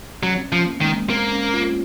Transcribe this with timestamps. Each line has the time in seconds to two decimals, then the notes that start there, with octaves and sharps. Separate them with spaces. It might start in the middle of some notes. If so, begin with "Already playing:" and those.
0.23 F#3 C#4
0.37 C4
0.49 F3 C#4
0.67 A#3
0.80 D#3 G#3
0.94 A#3
1.10 A#3 C4
1.32 C#4
1.54 F4